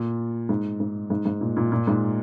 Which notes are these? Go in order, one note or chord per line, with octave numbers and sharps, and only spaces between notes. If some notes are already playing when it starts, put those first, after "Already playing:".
Already playing: A#2
G#2
G#2
G#2
G#2
A#2
A#2
A#2
G#2